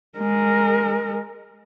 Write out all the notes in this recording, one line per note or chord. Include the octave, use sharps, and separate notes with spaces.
G#3 A#4